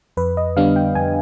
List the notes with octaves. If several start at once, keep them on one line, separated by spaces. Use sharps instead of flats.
F2 B4
D#5
D3 G3 B3 D4 F5
G5
F2 G#5